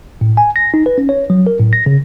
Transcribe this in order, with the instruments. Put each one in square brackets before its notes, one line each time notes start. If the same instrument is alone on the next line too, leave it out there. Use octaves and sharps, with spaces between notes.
[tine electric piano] A2
G#5
A#6
D#4
B4
C#4
C#5
F#3
A#4
A2
A#6
C#3